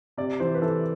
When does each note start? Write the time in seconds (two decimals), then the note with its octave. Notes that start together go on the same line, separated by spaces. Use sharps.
0.17 C3 D5
0.40 E3 C5
0.54 B4
0.62 E3 A4